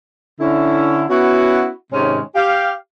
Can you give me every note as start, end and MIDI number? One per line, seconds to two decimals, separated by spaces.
0.40 1.04 50
0.40 1.04 61
0.40 1.04 64
1.10 1.70 59
1.10 1.70 61
1.10 1.70 64
1.10 1.70 66
1.93 2.20 44
1.93 2.20 48
1.93 2.20 51
1.93 2.20 56
1.93 2.20 61
1.93 2.20 73
2.35 2.71 67
2.35 2.71 77